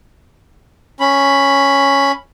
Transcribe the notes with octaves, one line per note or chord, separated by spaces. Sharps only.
C#4 B5